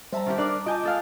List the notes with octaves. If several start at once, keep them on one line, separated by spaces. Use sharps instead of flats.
G3 C5 E5 A5 A#5
D#3 F4 G4
D4 A#4 D5
F4 D#5 G#5 A5 D6 G6
G#3 A4 F5